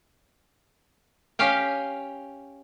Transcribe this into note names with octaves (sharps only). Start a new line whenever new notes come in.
C#4 G4 F5 G5